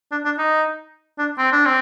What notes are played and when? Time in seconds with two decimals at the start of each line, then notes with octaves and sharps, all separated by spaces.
0.12 D4
0.25 D4
0.38 D#4
1.18 D4
1.38 C4
1.52 D4
1.65 C4